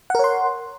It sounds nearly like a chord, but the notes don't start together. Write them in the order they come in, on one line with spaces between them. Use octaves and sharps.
F#5 A#4 C#5 C6